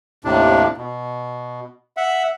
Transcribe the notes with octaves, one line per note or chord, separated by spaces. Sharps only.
D#2 A2 C3 D4
B2
E5 F#5